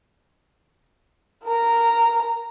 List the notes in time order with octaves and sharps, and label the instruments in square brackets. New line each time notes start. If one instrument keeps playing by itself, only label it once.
[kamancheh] A#4 A#5